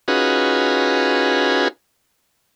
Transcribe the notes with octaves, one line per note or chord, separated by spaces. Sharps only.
C#4 D#4 F4 F#4 G#4 B4